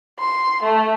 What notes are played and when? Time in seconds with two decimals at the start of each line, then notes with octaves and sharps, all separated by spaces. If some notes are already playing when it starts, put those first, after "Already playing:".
0.19 C6
0.63 A3